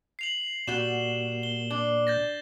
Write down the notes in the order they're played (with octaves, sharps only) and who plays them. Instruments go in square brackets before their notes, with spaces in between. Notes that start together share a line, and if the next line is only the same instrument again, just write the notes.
[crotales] C7 F7 F#7
[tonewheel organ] A#2 [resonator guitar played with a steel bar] G3 F#4 [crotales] E7 G7
[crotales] G7
[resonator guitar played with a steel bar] D4
[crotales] G6 A6 A#6